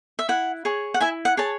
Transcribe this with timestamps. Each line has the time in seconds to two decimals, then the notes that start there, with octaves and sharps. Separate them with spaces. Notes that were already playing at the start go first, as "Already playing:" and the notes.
0.19 E5
0.29 E4 F#5
0.65 G#4 C#5
0.94 F#5
1.01 E4 E5 G#5
1.25 F#5
1.37 G#4 C#5 A5